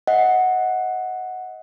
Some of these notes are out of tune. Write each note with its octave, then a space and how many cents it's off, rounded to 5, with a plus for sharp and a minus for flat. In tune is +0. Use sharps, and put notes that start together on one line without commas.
D#5 +25 F#5 +0